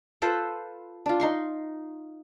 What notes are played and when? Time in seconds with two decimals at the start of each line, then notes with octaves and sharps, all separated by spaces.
0.22 F4 A4 B4 C5
1.06 D4 F4
1.20 D#4 C6 C#6